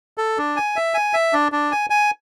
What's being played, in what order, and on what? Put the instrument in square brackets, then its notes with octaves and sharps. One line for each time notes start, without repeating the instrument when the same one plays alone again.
[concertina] A4
D4
G#5
E5
G#5
E5
D4
D4
G#5
G#5